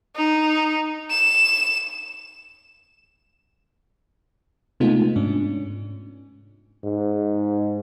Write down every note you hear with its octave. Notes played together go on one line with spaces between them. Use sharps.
D#4
E7
C3 G#3 A3 B3 D#4 F4
G#2 C#4 D4
G#2